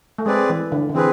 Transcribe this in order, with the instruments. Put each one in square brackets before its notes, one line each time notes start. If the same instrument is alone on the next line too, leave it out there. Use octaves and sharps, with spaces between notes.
[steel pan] A3
[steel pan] G#3 [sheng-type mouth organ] C4 G#4 B4 D5
[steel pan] E3
D3
D3
[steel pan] E3 [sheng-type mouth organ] C4 G#4 B4